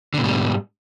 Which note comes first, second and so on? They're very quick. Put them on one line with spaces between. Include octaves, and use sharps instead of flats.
D3 B2 G#2 G3